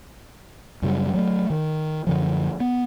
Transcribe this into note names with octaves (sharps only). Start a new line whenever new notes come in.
F#2 C#3 G3
F#3 G#3 A3
D#3
F#2 D3 F3
B3